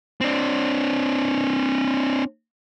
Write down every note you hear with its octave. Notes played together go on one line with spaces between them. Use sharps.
C4 D4